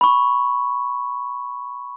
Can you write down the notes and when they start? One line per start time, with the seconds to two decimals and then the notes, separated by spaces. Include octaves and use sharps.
0.01 B5 C#6